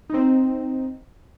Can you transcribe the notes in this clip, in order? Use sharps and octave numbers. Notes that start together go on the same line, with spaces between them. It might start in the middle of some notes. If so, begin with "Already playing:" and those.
C4 D#4